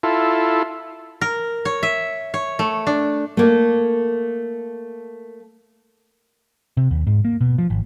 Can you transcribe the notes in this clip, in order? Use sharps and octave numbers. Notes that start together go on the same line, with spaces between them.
E4 F4 A4
A#4
C#5
E5
C#5
A3
D4
A3 A#3
C3
D#2
G#2
A#3
B2
F3
G#1